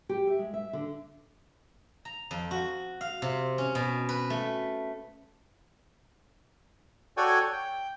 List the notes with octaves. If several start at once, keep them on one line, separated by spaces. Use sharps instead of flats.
G4
E5
G#3
E5
D3
A#5
F2
F#4
F5
C3
C#4
B2
B4
A3
F#4 A4 C#5 D5 G5 G#5
G5